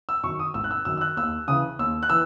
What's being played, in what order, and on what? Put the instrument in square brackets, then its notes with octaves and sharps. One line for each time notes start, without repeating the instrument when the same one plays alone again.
[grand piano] E6
F#2 C#6
D#3
D#6
G#1 E6
F#6
E6
F#2 D#3 E6
E6
F#6
D#2 E6
C#3 E3 D#6
D#2 E6
F#6
E3 E6